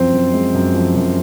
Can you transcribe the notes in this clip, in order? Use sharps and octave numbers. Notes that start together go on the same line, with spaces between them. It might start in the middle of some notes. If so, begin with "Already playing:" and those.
Already playing: F#2 F3 C4 C5
F#2
G#3
F#2
F3
F#2